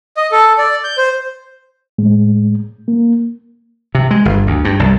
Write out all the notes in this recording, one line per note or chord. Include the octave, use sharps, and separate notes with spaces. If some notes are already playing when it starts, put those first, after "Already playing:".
D#5
A4
D5
G6
C5
A2 G#3
A#3
C3
G#3
G1
D2
G2
C2